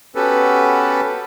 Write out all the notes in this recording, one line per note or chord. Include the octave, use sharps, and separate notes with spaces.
B3 C#4 F#4 G4 A4 B4